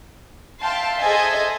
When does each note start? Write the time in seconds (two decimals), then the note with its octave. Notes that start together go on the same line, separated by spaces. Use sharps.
0.59 E5 F5 G5 A5 C6
0.99 G#4 A4 C5 D#5 E5 G#5